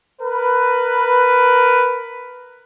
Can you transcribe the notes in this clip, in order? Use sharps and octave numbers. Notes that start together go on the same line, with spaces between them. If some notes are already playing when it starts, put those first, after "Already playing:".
A#4 B4